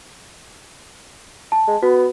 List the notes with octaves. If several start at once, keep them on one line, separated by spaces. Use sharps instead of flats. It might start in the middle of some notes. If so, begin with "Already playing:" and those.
A5
G#3
B3 F#4